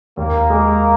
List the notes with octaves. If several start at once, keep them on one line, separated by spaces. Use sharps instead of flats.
D#2 A#3
G#3